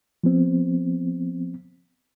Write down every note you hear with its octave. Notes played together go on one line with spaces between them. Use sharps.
F3 B3 C4